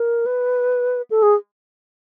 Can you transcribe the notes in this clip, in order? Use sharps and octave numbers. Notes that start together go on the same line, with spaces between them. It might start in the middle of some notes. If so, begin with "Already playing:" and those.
Already playing: A#4
B4
A4
G#4